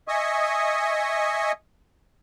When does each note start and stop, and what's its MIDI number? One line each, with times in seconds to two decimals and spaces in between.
0.08 1.52 75
0.08 1.52 76
0.08 1.52 80
0.08 1.52 85
0.08 1.52 87